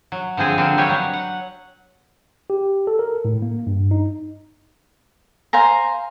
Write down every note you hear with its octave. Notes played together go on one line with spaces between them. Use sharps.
F#3
D3 F3 C4 G#4
D3 A#3 C4
G3 G4 B4 C#5
F#3
F#5
G4
A4
A#4
A2
A#3
G2
D#4
C5 F5 G#5 A#5